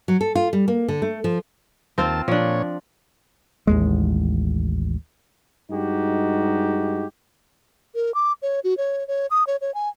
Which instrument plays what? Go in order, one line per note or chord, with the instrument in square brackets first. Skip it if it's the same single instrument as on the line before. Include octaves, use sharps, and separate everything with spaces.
[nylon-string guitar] F#3
A4
F4
G3
A#3
D3
A3
F3
[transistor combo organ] D#2 A5 [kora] C4 F4 C5
[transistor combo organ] A#2 C#5 [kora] F3 D4
[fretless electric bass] A1 D#2 G#3
[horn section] G2 G#3 D#4 F#4 G4
[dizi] A#4
D6
C#5
F#4
C#5
C#5
D#6
C#5
C#5
G#5